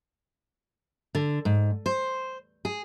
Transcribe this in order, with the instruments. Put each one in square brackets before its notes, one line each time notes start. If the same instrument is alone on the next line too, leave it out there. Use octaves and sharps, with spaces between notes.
[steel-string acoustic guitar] D3
G#2
C5
G#4